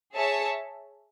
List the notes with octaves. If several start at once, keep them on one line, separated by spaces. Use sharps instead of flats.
G#4 C#5 E5 A5